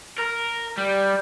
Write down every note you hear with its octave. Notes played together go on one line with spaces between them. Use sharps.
A#4
G3